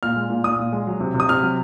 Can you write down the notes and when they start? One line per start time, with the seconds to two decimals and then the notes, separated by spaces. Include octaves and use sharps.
0.03 A#2 F6
0.16 G#3
0.30 A#2
0.44 A#2 D#6
0.59 A#2
0.72 G#3
0.87 F#3
1.00 C3
1.14 C3
1.20 D#6
1.29 C3 F6
1.42 F#3